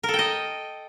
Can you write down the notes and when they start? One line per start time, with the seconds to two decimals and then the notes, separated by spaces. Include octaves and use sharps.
0.03 A#4
0.09 A4
0.14 G5
0.19 D#5